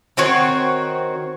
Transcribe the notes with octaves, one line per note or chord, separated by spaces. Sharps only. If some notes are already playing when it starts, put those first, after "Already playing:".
D#3 C4 F#4 C#5